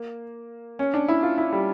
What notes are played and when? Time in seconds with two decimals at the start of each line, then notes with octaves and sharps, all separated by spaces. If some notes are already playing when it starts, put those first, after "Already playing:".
Already playing: A#3
0.79 C#4
0.94 D4
1.08 E4
1.23 F4
1.38 E4
1.53 G3